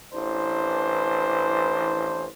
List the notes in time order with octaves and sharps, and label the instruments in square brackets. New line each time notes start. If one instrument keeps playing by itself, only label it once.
[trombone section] A1 E3 D4 C5